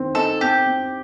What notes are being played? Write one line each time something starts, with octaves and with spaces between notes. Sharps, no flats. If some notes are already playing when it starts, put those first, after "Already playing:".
Already playing: D#3 C4
D#4 A4
C4 G4
C4